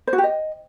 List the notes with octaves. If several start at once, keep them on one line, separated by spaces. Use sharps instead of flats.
C5
F#4
G4
D#5